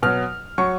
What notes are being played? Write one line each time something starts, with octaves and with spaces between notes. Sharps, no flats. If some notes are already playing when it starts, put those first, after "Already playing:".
B2 F#3 F6
F#3 C#6